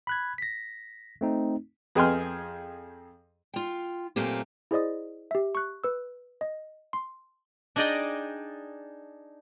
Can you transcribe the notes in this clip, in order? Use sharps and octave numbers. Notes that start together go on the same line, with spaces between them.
B5 F#6 G#6
A#6 B6
A3 C4 D#4
F2 G#4 G5 G#5 C6 F6
F4 G5
F#2 A#2 A3 A#3 C4 G4
E4 G#4 C5 D5 D#5 D#6
G4 E5
C#6 F#6
B4 E6
D#5
C6
D4 D#4 G#4 D5 D#5 G5